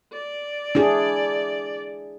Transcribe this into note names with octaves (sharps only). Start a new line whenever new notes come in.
D5
D4 E4 G#4